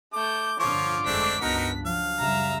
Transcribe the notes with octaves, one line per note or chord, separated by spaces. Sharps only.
A3 D6 G6
G2 D3 F3 F4 C#5 D6
F1 F2 G#3 A3 C4 D4 B6
C#2 G2 B3 D4 D#4 F#4 A#4
F3 F#3 F5
F#2 C#3 G3 E5 A#5